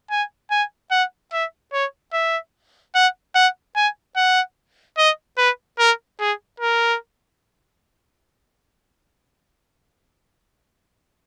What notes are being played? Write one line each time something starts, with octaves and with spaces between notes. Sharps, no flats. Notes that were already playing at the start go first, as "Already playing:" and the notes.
G#5
G#5
F#5
E5
C#5
E5
F#5
F#5
G#5
F#5
D#5
B4
A#4
G#4
A#4